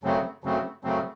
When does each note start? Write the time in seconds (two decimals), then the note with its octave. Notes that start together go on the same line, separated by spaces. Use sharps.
0.03 F#2 C#3 F#3 A3 C4
0.44 F#2 C#3 F#3 A3 C4
0.84 F#2 C#3 F#3 A3 C4